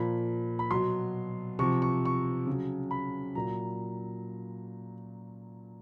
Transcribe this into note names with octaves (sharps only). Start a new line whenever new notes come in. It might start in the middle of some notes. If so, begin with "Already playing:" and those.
Already playing: A#2 F3 B5
B5
B2 F#3 C6
C3 F3 C#6
C#6
C#6
C#3 F#3
B5
A#2 F#3 A#5